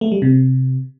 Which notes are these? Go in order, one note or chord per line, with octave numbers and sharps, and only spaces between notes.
A3
G3
C3